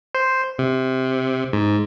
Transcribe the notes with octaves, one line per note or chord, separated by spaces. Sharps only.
C5
C3
G#2